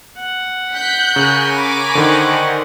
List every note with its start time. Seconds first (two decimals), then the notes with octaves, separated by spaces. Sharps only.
0.17 F#5
0.74 F#6 G6 B6
1.16 C#3 A#4 G#5 C#6
1.55 B5 D6
1.95 D3 D#3 C5 F#5